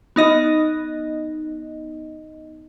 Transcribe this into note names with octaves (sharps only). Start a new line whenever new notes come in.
B3 D#4 D#5